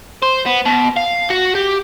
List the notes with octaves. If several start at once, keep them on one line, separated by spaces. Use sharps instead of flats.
C5
B3
B2
F5
F#4
G4